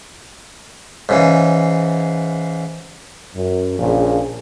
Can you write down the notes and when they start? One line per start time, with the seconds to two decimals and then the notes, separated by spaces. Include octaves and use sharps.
1.09 G#2 C#3 E3
3.35 F#2
3.79 A#1 A#2 C#3 F3